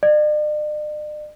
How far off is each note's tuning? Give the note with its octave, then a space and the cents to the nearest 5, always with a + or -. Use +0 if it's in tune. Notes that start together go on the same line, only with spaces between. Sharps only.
D5 +45